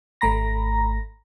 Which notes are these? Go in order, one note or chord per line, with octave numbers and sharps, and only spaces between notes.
G#1 A3 A#5 B5 A#6